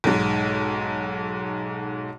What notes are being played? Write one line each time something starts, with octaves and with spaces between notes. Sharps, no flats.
B1 G#2